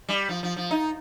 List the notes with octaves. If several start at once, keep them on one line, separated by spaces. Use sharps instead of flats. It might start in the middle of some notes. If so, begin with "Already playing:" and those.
G3
F3
F3
F3
D#4